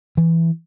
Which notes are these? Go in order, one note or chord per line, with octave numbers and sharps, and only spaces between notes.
E3